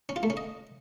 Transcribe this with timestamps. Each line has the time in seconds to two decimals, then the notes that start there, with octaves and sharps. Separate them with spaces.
0.09 C#4
0.16 F4
0.23 A3
0.30 C#4
0.37 D#5